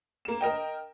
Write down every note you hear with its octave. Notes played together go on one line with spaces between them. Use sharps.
A#3 E7
A#4 D#5 G5